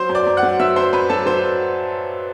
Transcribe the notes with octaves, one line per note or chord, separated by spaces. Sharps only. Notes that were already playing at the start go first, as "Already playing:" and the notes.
Already playing: F#3 C5 C6
F#2
D5 D6
F#2
F#5 F#6
F#3
F#3 E5 E6
F#2 C5 C6
F#2 B4 B5
F#3 A4 A5
F#3 C5 C6